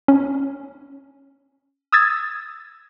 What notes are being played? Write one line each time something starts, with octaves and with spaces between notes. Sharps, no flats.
C#4
D#6 E6 G#6 A6